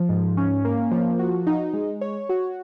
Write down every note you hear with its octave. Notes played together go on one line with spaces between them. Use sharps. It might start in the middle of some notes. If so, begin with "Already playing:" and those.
Already playing: F3
G#2
C#4
A#3
F3
F#4
D#4
G#3
C#5
F#4